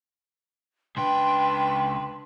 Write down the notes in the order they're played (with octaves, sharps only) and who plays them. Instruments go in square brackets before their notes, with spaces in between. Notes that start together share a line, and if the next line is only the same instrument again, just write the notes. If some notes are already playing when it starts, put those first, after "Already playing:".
[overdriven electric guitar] C#2 G5 [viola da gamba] D4 B4 [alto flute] C6